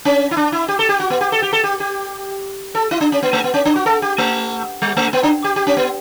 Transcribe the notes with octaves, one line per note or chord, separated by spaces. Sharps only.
C#4
E4
D4
E4
G4
A4
G4
F#4
B3
G4
A4
G4
A4
G4
G4
A4
E4
D4
C#4
B3
A3
B3
C#4
D4
F#4
A4
G4
A3
G3
A3
B3
D4
G4
G4
C#4
B3